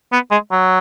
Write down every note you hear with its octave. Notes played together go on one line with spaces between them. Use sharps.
B3
G#3
F#3